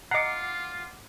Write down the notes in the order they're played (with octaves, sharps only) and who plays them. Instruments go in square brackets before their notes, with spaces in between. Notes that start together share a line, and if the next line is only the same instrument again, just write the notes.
[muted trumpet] F4 [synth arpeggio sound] D#5 A#5 [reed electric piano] F#5 D6 [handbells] C7 C#7